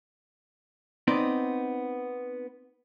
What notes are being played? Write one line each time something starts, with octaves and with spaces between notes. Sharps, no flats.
B3 C4 D#4 D5